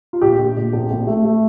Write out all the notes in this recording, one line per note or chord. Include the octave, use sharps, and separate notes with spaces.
F4
A#1 G4
A#1
A#2
A#1
A#1
A3
A3